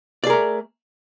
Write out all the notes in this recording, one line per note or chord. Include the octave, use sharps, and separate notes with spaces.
A3 G#4 A#4 D5